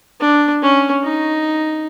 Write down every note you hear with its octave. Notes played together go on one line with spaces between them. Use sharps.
D4
C#4
D#4